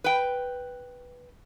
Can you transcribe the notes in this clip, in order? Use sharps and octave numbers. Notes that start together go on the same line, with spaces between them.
B4 G5